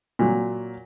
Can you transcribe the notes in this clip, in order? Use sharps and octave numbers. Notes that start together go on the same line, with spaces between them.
A#2 F#3